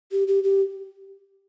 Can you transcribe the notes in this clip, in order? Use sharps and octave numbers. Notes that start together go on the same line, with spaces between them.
G4
G4
G4